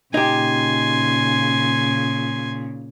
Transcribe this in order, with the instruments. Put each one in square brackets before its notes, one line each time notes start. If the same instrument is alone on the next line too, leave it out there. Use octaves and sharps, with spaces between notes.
[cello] A#2 C#3 [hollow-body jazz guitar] D#4 G4 [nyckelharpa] G#5 C6